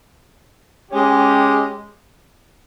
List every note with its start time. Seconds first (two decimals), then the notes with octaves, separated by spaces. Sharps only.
0.90 G#3 C#4 G4